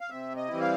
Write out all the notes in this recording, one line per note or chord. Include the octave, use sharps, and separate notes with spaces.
F5
C3 E5
D#5
E3 G3 C4 E4
F5